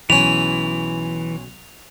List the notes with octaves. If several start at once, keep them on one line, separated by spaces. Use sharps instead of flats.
B1 E3 C#4 F7